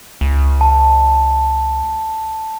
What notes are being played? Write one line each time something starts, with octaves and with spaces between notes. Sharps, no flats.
C#2
A5